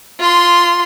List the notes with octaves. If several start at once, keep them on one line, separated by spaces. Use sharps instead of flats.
F4 C6